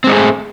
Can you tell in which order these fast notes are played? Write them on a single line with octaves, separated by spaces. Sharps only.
C4 G#3 D#4 G#4 A3